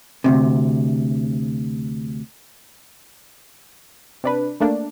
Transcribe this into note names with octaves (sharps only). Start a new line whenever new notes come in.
D2 G2 C3
C3 D4 B4
A3 A#3 D4